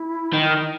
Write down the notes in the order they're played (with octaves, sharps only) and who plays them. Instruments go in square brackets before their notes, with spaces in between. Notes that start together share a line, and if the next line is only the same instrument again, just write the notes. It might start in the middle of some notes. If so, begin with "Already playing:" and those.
Already playing: [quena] E4
[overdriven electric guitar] D#3